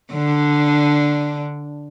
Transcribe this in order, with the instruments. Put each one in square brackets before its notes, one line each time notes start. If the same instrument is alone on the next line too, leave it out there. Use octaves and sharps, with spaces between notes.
[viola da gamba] D3 D4